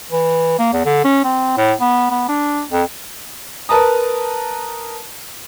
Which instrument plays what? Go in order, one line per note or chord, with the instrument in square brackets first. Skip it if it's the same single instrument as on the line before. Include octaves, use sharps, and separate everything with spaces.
[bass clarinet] E3
A#3
E2
D3
C#4
C4
A2
B3
B3
D4
F2
[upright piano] A#4 B4 A5 A#5 D#6